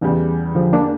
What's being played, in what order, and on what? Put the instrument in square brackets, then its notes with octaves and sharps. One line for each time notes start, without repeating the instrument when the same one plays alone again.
[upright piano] E2 C#3 G3 [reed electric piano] E3
[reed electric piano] D3 F3
A#3 D4